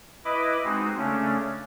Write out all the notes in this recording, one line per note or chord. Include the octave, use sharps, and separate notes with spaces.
E4 B4 D#5 B5 D6
G#3 C4 D#4 F#4
C#3 A3 C#4 D4